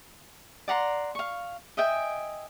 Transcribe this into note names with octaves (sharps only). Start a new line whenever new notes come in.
D5 F#5 A#5 C6
F5 C#6
D#5 E5 G5 G#5